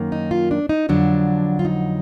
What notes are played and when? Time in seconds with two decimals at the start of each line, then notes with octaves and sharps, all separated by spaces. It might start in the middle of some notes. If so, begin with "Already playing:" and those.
Already playing: F#2 D#3 A#3
0.12 D#4
0.31 F4
0.51 D4
0.69 D#4
0.89 F2 D3 F#3 D4
1.59 F4
1.65 D#4